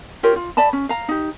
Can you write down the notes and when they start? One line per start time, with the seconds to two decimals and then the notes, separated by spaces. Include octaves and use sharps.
0.23 F4 G4 A#4 C#5
0.36 F4
0.57 D5 E5 A5 B5
0.73 C#4
0.89 F5 A#5
1.09 D#4 G4